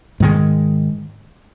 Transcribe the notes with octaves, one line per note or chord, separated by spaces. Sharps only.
G#2 D#3 G#3